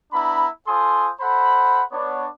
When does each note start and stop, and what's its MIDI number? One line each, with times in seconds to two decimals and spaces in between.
0.13 0.47 59
0.13 0.47 62
0.13 0.47 64
0.13 0.47 82
0.13 0.47 83
0.67 1.11 65
0.67 1.11 69
0.67 1.11 72
0.67 1.11 80
0.67 1.11 84
0.67 1.11 87
1.21 1.83 69
1.21 1.83 72
1.21 1.83 78
1.21 1.83 83
1.92 2.27 59
1.92 2.27 62
1.92 2.27 73